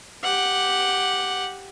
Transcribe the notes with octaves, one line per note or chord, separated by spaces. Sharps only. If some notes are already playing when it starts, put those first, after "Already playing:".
G4 F#5